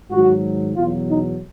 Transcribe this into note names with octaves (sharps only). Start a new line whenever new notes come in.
G#2 D#3 F#3 F#4
E2 B2 F#3 F4
D#4